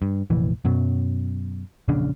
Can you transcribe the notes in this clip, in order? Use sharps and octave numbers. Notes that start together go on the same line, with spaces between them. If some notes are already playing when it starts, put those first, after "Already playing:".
G2
F1 A#1 E3
F#2 B2 F#3
E1 A#1 C#3 D4